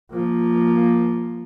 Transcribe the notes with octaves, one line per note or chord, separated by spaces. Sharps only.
F3 A#3